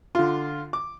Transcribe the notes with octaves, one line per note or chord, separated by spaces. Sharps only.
D3 F4
D6